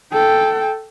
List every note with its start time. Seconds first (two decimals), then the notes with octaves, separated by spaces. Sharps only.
0.12 A4 G5